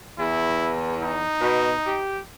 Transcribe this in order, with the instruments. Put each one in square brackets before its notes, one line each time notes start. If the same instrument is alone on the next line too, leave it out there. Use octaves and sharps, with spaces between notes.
[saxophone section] E2 [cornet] E4
[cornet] D#4
[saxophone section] B2
G4